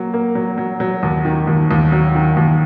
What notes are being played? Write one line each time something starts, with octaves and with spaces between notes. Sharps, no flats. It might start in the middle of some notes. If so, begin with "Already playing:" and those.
Already playing: F#3 A#3
A#3
F#3
F#3
F#3
D#2
D#3
D#2
D#2
F#3
D#3
D#2